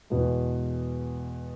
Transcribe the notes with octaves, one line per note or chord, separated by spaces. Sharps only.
E2 B2 G#3